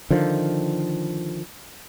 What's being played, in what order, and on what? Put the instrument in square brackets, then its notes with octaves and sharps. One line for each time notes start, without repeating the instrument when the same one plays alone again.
[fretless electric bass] D3 D#3 F3